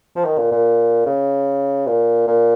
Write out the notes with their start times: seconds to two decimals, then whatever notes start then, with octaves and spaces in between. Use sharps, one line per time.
0.16 F3
0.25 D#3
0.38 A#2
0.52 A#2
1.06 C#3
1.87 A#2
2.27 A#2